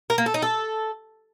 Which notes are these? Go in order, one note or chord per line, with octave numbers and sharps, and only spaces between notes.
A#4
A#3
A4
D#4
A4